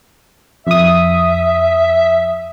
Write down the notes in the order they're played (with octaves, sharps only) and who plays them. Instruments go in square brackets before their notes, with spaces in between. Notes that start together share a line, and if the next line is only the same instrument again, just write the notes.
[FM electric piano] F2 D#6 [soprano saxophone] E5